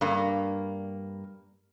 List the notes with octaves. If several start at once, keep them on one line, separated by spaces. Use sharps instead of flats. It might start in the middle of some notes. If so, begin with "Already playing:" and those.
G2 A#3